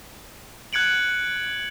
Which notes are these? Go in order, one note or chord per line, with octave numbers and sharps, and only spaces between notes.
F#6 G#6 C#7 D7 F#7